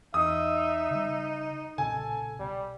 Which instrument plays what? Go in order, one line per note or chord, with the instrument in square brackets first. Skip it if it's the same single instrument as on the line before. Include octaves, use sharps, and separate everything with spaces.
[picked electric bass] E2 [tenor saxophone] D#4 [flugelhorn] E5 [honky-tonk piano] D#6
[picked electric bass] C#3 G3
[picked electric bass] B1 A#2 C#3 [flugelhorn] A4 [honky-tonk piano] G#5
[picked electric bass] B1 [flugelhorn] G3